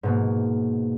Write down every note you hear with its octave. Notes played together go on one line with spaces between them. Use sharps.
G#2 B2 A#3